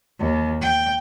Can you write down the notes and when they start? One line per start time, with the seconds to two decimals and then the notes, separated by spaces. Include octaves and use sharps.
0.20 D#2
0.62 G5